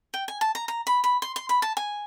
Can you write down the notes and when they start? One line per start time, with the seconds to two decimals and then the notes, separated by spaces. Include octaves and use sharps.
0.14 G5
0.28 G#5
0.41 A5
0.55 A#5
0.68 A#5
0.87 B5
1.04 B5
1.22 C6
1.36 C6
1.49 B5
1.62 A5
1.77 G#5